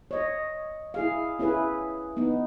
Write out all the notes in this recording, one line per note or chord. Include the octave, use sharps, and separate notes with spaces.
C#5 D#5
E4 G#4 F5
C#4 E4 G#4 B4
B3 D#4